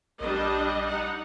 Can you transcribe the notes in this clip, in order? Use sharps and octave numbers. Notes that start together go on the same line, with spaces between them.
A#1 G3 D4 D#5
D#4 F#5